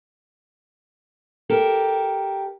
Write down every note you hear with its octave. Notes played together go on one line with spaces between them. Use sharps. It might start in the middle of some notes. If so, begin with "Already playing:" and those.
G4 A4 A#4